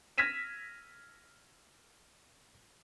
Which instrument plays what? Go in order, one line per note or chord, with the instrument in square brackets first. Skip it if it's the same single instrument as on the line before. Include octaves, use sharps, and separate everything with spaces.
[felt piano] F6 G#6 A#6 B6 D#7 E7